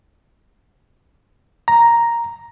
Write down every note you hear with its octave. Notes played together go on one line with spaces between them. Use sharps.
A#5